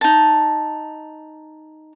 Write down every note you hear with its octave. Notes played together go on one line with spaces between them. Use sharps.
D#4 A5